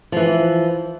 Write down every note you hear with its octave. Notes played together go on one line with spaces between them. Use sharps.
E3 F3